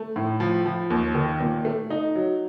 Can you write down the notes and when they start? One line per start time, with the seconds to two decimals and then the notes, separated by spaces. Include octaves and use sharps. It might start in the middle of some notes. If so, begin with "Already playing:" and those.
Already playing: A3
0.16 A2
0.40 F3
0.65 F3
0.90 D#2
1.15 D#3
1.40 A#2
1.65 A3
1.90 D#4
2.15 F#3